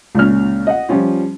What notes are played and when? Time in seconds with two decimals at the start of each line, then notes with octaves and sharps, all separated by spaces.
0.15 C#2 A#2 C#4 F6
0.67 D#5 F#5
0.89 F3 G3 C#4 F4